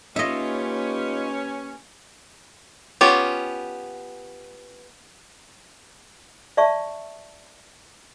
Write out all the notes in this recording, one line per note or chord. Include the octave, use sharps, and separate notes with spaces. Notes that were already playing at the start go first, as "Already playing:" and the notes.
A#3 C#4 D#4 F4 G4 B4 D#5 E5
B3 C#4 F4 G4
D5 E5 A5 C#6